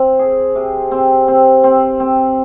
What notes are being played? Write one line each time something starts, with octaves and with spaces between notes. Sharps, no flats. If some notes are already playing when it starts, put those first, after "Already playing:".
Already playing: C4
G#4
C3
C4
C4
C4
C4